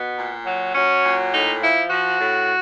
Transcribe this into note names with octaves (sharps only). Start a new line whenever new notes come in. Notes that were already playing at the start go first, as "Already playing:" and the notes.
Already playing: B2 B3
A#2
F#3
F#3 C#4
A#2
A2 D#4
F3 E4
F3 F#4
A2